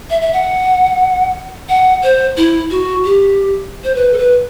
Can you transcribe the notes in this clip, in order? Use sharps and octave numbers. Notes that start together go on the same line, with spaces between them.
E5
E5
F#5
F#5
C5
E4
F#4
G4
C5
B4
A4
B4